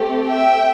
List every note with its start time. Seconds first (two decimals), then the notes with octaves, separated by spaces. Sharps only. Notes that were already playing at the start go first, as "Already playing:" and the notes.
Already playing: A3 C4 G4
0.26 E5 G5